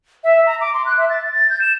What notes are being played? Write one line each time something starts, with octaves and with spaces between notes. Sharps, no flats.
E5
A#5
D6
C6
F#6
E5
A6
A6
G6
E7